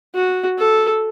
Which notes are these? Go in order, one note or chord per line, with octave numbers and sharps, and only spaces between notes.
F#4
A4